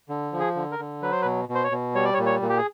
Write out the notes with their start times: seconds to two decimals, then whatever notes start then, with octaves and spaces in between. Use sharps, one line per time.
0.09 D3
0.32 F3
0.40 G#4
0.56 D3
0.71 A#4
0.79 D3
1.02 F#3 B4
1.12 C5
1.22 B4
1.25 B2
1.49 B2
1.55 C5
1.64 C#5
1.71 B2
1.95 G3 C#5
2.04 D5
2.14 C#5
2.18 A#2
2.26 C#5
2.42 A#2
2.49 G4
2.57 G#4